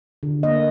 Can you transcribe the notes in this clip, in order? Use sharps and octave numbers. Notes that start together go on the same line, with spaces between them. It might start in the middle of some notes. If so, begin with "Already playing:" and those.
D3
A#3 D#5